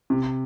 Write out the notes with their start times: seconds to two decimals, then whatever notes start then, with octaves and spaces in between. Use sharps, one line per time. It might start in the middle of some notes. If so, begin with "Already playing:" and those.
0.10 C3